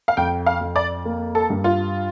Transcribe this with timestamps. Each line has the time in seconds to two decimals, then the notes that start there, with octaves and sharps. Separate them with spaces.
0.08 F5
0.17 F2 G5
0.46 F5
0.61 F2
0.76 D5
1.05 A#3
1.35 A4
1.50 G2
1.64 F4